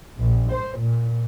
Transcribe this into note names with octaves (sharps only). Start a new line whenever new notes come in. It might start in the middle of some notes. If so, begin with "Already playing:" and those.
A#1
C5
A#2